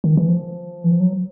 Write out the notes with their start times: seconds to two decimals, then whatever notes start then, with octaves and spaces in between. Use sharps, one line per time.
0.04 D#3
0.17 E3
0.28 F3
0.84 E3
0.92 F3
1.00 F#3